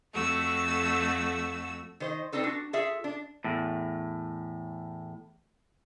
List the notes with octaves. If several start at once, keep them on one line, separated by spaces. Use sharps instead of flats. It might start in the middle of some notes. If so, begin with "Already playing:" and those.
F2 A3 F#4 E6
D#3 C5 D#5
C4 D4 D#4 A4 B4
D4 F#4
F4 G#4 A4 E5
D4
E2 A2